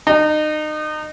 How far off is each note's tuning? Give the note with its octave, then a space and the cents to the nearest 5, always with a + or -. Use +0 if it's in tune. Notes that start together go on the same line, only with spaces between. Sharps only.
D#4 -30